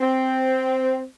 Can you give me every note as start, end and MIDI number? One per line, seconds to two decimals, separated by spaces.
0.01 1.04 60